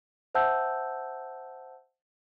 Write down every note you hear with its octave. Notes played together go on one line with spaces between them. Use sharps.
C5 E5 F#5 A5 E6 G6